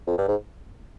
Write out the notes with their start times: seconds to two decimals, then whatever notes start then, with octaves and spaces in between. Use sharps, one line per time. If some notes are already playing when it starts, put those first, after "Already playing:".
0.07 F2
0.18 G2
0.28 G#2